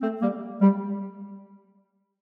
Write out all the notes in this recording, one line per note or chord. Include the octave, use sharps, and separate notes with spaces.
A3 C4
G3 A#3
G3